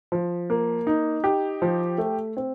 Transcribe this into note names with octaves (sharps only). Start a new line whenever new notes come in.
F3
A#3
D#4
G4
F3
A3
C4